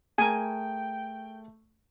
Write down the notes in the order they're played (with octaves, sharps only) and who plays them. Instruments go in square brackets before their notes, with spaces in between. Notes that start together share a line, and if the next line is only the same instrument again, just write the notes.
[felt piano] A3 [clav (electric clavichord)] G#4 A#4 [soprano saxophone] G5 [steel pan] G#5